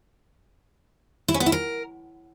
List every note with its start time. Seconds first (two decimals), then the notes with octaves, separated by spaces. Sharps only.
1.28 E4
1.34 C#4
1.40 B3
1.46 E4
1.52 A#4